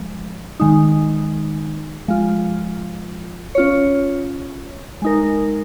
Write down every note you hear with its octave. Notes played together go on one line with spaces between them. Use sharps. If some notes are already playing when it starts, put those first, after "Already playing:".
Already playing: F3 G#3
D#3 G#3 D#4
F3 G#3 F4
C#4 F4 C#5
G#3 D#4 A#4